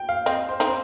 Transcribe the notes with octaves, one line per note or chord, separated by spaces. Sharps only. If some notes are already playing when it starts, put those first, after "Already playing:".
Already playing: G5
F5
C4 D#5
C5
C4 D#4
C5